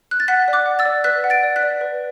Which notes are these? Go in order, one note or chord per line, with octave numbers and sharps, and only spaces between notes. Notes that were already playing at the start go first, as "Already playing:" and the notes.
F#6
A6
F#5 F#6 B6
D5
D6 F#6
F#5
E6 A6
D5
B4 F#6 B6
F#5
A6 D7
D5
F#6 B6
D5
B4